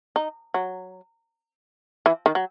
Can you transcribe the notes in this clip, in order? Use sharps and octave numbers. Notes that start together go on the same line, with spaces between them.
D#4
F#3
E3
D#3
F#3